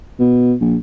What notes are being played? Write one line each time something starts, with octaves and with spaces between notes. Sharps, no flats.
B2
A#1